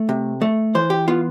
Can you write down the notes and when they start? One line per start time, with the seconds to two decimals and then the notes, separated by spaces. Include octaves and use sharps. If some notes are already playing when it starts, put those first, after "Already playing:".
Already playing: A3
0.09 C3
0.42 A3
0.75 E3 C5
0.90 G4
1.08 B3 F4